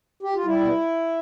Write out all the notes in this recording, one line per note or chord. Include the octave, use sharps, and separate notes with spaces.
G4
F4
G3 E4
B2